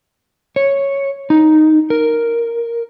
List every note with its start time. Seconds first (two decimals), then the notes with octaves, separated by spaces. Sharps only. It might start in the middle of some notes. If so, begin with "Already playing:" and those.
0.56 C#5
1.30 D#4
1.90 A#4